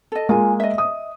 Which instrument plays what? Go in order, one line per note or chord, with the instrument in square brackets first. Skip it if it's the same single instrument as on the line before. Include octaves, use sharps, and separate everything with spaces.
[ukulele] A4 D#5
[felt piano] G#3 A#3 [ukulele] F4 G#5
[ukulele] D#5 E5
[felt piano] D#6